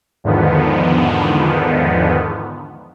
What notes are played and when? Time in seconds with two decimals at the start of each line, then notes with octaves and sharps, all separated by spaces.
0.24 E2 G#2 D3 D#3 F3 B3